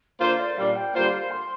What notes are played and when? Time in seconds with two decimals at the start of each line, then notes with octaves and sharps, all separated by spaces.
0.20 D3 A#3 F4 C5 F5
0.39 D5
0.57 A#2 G3 D4 F5
0.76 G5
0.94 D3 G3 A#3 F4 C5 F5
1.31 C6